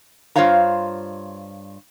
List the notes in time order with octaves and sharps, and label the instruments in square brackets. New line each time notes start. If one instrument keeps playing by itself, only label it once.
[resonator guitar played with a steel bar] G2 F4 C5 C#5 F5 A#5